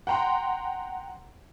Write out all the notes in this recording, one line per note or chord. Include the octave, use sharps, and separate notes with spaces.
F#5 G5 A#5 C6